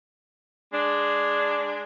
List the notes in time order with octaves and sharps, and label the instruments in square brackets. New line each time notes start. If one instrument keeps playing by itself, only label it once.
[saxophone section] G#3 D4